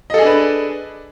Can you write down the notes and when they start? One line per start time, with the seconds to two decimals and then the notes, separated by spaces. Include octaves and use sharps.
0.10 D#5
0.14 A4
0.18 G#4
0.22 D4
0.26 B4